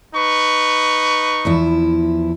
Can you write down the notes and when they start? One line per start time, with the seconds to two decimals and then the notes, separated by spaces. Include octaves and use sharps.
0.15 D#4 B4 C#6
1.45 E2 F3 E4